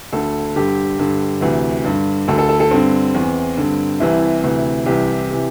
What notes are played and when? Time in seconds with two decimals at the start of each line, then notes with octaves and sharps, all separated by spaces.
0.13 D2 D3 A4
0.56 G2 D3 G4
0.99 G2 D3
1.41 D2 C3 E3
1.84 G2 D3
2.28 D2 D3 A4
2.38 A4
2.49 A4
2.60 A4
2.71 G2 D3 C4
3.14 E2 E3
3.57 G2 D3
4.00 C2 C3 E3 E4
4.43 D2 C3 E3
4.86 C2 C3 E3 G4
5.31 C3 E3